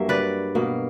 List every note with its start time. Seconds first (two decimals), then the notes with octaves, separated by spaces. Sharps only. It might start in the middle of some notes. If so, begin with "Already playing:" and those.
Already playing: G2 F#3 A#3 E5
0.09 B4 D5
0.55 B2 A#3